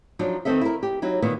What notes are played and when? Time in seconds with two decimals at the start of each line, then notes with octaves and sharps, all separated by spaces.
0.19 F3 F#3 D4 D#4
0.45 D#3 B3 C4 A4 D#5 E5
0.61 E4 A#4
0.83 G4
1.02 F#3 D#4 E4
1.22 A#2 D#3 E3 B3